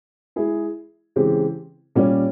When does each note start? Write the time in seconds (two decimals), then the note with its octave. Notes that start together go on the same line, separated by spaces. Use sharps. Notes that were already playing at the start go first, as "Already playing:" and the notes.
0.36 G#3 E4 G#4
1.16 C#3 E3 G#3 C4 G4
1.95 A#2 G3 C#4